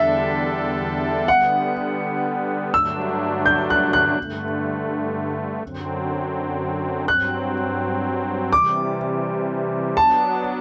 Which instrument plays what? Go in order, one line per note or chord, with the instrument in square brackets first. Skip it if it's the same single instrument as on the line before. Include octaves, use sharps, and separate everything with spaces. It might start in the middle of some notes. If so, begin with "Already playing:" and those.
Already playing: [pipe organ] E2 D3 G3 D4 A4 [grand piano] E5
[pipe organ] D3 G3 B3 [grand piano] F#5
[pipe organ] G2 D3 F#3 A3 D4 [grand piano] E6
[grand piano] G6
F#6
F#6
[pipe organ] G2 D3 A3
F#2 D3 F#3 C4
[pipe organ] G2 F#3 C4 [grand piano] F#6
[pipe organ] C3 E3 G3 [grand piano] D6
[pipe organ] F#3 B3 D4 [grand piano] A5